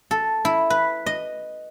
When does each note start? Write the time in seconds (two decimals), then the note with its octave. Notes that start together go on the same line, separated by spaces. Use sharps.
0.11 A4
0.45 E4
0.70 B4
1.06 D#5